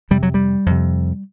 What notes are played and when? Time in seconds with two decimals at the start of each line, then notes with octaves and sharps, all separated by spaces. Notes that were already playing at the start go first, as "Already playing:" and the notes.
0.11 F2 C3 G3
0.23 F#3
0.34 G3
0.66 F2 C3